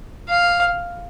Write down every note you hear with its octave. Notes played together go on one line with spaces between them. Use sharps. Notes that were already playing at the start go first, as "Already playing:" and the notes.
F5